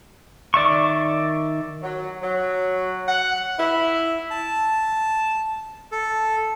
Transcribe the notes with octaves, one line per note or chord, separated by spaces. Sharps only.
D#3 D5 E5 C#6
F#3
F#3
F#5
E4
A5
A4